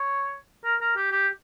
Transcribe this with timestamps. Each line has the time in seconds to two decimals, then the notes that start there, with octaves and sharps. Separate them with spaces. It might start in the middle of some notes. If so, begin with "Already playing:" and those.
Already playing: C#5
0.64 A#4
0.81 A#4
0.96 G4
1.11 G4